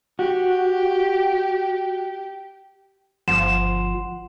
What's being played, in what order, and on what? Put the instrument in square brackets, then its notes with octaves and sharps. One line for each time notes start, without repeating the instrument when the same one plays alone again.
[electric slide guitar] F#4 [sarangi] G4
[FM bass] G1 [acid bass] F3 [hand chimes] F#5 C6 [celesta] E7